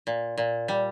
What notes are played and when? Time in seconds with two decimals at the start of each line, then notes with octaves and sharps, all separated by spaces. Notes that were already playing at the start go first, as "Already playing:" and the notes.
0.07 A#2
0.38 A#2
0.68 G3